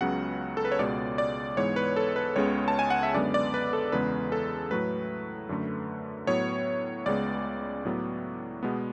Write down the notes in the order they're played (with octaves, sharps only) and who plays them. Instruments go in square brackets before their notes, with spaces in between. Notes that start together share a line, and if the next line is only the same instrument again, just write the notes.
[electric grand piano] C#2 C#3 F#3 B3 F#5
A4
B4
C#5
C#2 B2 G#3 B3 D5
D5
G#2 E3 G#3 B3 C#5
B4
A4
B4
C#2 C#3 G#3 B3 C#5
A5
G#5
F#5
E5
F#2 D3 G#3 B3 D5
D5
B4
A4
E2 C#3 G#3 B3 B4
A4
A2 F#3 A3 B4
F#2 D3 A3
A2 F#3 B3 C#5
C#2 C#3 G#3 B3 D5
A2 F#3 B3
B2 G#3 B3